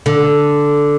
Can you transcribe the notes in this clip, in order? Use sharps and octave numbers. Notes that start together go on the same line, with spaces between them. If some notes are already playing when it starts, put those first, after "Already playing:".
D3